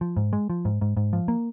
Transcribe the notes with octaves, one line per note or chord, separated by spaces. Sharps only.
F3
G#2
G#3
F3
G#2
G#2
G#2
F3
A#3